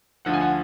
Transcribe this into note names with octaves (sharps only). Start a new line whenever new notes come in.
D2 D3 F3 F#5
G#5
F#5